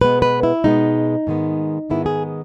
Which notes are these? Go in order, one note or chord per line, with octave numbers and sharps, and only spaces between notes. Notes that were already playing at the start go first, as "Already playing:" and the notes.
B2 G#3 B3 B4
B4
E4
B2 G#3 B3 D#4
G#2 D#3 G#3 B3
G#2 D#3 G#3 B3 E4
G#4